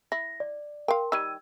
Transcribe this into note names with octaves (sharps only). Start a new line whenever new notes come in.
E4 A#6
D5
A#4 F5 G5 C6
D#3 G3 E6 G#6 D#7